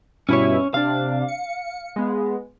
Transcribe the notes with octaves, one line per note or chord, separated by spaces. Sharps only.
G2 B2 C#4 E4 C#5
C3 D4 F5
C#7
G#3 B3